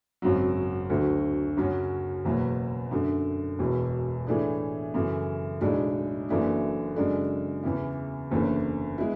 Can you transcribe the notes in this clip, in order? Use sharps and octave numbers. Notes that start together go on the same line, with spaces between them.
G#1 F#2 C#3 F#3
D2 D3 F#3 A3
F#2 C#3 F#3 C#4 F#4
F#1 E2 B2 F#3
F#2 D3 A3
E1 E2 B2
A2 E3 A3 D4 G#4
F#2 C#3 E3 A3
B1 A2 G#3 D4
F#1 F#2 E3 A3 D4
F#2 C#3 G#3 D4 A4
E2 C#3 E3
F#1 E2 D3 A3 C#4
G#3 B3 E4